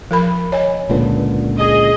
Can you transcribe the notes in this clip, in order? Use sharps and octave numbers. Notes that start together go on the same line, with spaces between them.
F3 A#4 B5
C#5 D#5 G#5
C#2 A#2 D3 B4
G#4 D#5